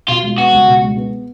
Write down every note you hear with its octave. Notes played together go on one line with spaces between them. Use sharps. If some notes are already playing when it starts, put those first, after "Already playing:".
B2 F4
G#3
B3 F#4
C#2
B2
G#3
B3